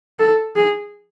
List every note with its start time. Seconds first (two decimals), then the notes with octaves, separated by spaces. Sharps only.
0.19 A4
0.56 G#4